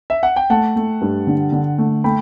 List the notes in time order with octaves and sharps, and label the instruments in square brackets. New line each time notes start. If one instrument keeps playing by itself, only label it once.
[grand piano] E5
F#5
G5
[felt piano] A3 [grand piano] F#5 A5
[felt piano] A3
G2
D3
D3
A3
[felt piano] A3 [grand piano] G5 B5